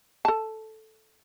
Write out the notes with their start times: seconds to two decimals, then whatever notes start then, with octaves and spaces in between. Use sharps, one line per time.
0.25 A4 A5